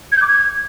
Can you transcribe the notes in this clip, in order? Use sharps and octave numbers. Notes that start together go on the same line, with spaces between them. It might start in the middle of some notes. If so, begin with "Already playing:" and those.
G#6
G6
D6
G#6